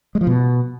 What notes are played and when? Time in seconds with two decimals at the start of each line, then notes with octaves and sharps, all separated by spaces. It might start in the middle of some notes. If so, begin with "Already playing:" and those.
0.15 G#3
0.21 F3
0.27 B2